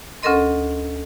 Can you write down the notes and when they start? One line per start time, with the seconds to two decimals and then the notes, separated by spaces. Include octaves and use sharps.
0.23 D2 C#4 A4 A#4 D#5 C6